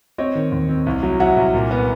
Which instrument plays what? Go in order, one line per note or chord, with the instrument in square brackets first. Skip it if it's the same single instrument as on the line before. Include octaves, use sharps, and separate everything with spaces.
[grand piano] C4 C#5 D#5
D#3
D#2
C4
C2
F#3
F#3 E5 F#5
C2
A#2
B3